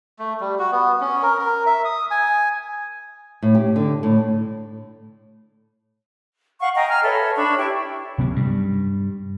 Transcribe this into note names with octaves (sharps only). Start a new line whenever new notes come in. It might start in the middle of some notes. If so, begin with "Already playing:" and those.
A3
G3
F#4
B3
C#4
A#4
A#4
E5
D#6
G#5
A2
G4
D3
A2
F5 F#5 C#6
D#5 F5 G5 A#5
G#5 A#5 F6
A4 B4 C#5 E5
D4 C#5 B5 C#6
E4 G4 C#6
C3 F#3 B3 C#4
G2 G3